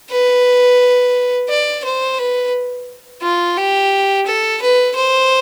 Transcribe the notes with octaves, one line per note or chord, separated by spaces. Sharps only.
B4
D5
C5
B4
F4
G4
A4
B4
C5